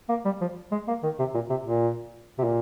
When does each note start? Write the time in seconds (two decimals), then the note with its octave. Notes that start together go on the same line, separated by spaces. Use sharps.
0.09 A#3
0.25 G3
0.41 F3
0.72 G#3
0.87 A#3
1.03 D#3
1.19 C3
1.34 A#2
1.50 C3
1.65 A#2
2.38 C3
2.44 A#2